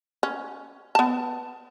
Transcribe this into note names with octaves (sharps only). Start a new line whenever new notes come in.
C#4
B3 A5